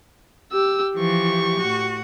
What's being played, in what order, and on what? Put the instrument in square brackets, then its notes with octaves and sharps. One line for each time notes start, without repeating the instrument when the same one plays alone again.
[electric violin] G4 E6
[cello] E3 F3 [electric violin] G4 C#6
[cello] A2 F#4